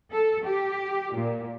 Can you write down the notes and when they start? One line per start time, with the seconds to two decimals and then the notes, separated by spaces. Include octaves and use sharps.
0.11 A4
0.44 G4
1.13 A#2